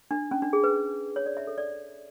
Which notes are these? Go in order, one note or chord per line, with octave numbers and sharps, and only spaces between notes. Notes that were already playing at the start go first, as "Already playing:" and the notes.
D4
C#4
D4
G#4
B4
C#5
D5
E5
A4
D5